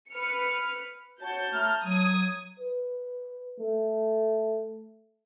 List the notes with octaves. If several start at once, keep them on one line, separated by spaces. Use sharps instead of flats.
B4 F6 C#7
F#4 C#5 A5 G6
A3 A#5 F6
F#3 D#6 G#6
B4
A3